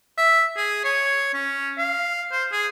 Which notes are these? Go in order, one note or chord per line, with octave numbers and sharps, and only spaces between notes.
E5
G#4
C#5
C#4
F5
C5
G#4